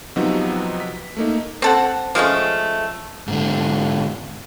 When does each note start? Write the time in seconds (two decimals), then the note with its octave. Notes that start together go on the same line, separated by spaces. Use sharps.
0.16 C3 F3 F#3 B3 D#4 F#4
0.80 B6
1.17 A3 A#3 D#4
1.62 C4 A4 F#5
2.15 F3 G#3 A3 C#4
3.28 G#2 D3